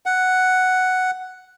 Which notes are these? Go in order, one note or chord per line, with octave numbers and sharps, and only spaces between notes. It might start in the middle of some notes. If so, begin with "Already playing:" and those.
F#5